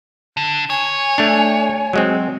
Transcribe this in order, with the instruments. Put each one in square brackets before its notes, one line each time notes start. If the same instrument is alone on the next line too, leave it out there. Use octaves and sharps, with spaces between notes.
[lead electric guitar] D3
[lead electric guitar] C#5 [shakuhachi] G#5
[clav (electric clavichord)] A3 D4
F#3 G#3 C4